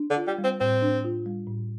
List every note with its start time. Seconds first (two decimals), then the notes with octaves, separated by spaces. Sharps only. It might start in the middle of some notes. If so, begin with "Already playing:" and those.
Already playing: D4
0.10 D3
0.17 F4
0.27 G3
0.38 G3
0.44 C4
0.60 A2 C4
0.82 D4
1.04 F4
1.26 G3
1.47 A2